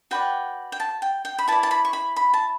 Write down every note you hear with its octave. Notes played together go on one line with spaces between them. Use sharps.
F#4 B4 D5 G5
G5
A5
G5
G5
B5
E4 B4 D5 A5
A5
B5
C#6
B5
B5
A5